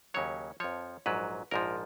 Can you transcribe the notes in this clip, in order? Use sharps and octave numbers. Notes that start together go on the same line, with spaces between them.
D#2 C#3 F#3 C#5
F2 F3 C#5
A#1 G#2 F#3 B4
A#1 G#2 F3 A#4